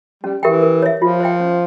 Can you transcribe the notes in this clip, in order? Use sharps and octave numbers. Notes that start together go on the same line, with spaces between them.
G3 C#4
E3 G4 A#4 E5 G5
A#4
C#5 E5
F3 F4
C5 E5 G5
C#4